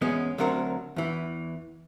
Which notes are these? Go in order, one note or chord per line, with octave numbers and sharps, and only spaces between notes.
E2 G#3 B3 C#4
D2 F#3 C4 A#4 F#5
E2 E3